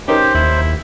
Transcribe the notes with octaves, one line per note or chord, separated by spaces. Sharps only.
C#4 D#4 G4 A#4 C5
D#2 E4